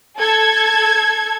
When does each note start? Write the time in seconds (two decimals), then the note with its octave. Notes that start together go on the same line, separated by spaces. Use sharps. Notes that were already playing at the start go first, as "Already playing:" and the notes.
0.18 A4 G#6